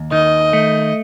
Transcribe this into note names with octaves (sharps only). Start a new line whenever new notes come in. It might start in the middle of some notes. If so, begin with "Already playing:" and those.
Already playing: D#2
D#3 D#5
A3